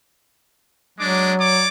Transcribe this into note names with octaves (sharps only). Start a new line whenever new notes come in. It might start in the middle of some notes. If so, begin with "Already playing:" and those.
F#3 G#3 D4 D6
C#5 D5 D6